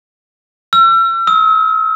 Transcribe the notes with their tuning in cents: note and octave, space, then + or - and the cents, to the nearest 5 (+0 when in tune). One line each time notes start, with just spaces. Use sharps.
E6 +40
E6 -40